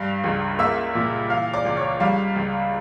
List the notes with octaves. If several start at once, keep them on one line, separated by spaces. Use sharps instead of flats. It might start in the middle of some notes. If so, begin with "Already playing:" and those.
Already playing: G2 G3 F5 F6
C#2
A#3 E5 E6
A#2
E3 F5 F6
D5 D6
C#2
C#5 C#6
G3 F5
C#2